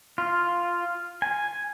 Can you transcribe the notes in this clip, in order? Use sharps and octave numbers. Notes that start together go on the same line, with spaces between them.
F4
G#5